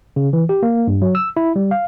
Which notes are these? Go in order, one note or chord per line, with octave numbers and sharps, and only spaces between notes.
C#3
E3
G4
A#3
G2
F#3
E6
E4
G3
F5